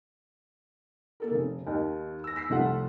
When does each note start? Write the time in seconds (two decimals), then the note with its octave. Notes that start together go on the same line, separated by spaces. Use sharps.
1.20 A#3 A4 A#4
1.31 F1 C#3
1.67 D#2 D#3
2.24 E6 A#6
2.36 E6 B6 C7
2.50 F1 C2 A3 F4 A4 F#5